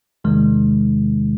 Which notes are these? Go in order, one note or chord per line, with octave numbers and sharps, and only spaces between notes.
E2 C3 D#3 G#3